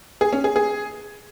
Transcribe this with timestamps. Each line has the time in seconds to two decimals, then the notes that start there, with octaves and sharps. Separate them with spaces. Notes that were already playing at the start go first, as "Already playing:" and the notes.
0.21 G#4
0.33 C#4
0.44 G#4
0.56 G#4